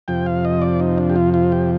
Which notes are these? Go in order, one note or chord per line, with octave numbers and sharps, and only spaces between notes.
F2 C3 F3 G5
F5
D#5
D5
D#4
D4
G4
F4
F4
G4